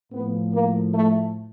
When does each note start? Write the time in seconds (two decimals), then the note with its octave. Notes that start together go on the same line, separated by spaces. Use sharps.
0.12 A2 F3 B3
0.54 A#3
0.94 A3